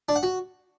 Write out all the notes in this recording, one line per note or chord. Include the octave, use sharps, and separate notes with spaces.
D4
F#5
F#4